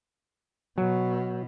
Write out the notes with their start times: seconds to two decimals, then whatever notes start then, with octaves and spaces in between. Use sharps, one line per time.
0.78 B2 F#3